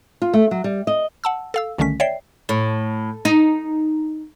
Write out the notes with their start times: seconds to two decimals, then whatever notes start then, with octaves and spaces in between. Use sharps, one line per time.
0.22 F4
0.34 A3
0.51 F#3
0.64 G3
0.87 D#5
1.24 F#5 A5 E6
1.54 A4 F5 E6
1.78 C2 D3 D#3 A3 C#4 B6
2.00 C#5 D5 E5 G5 C7
2.49 A2
3.25 D#4